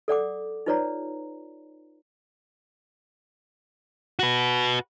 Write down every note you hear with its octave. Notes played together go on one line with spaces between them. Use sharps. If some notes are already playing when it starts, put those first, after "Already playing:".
A4 D5 F#5 D6
D#4 F4 B4 C#5 D5 A#5
F#4 B4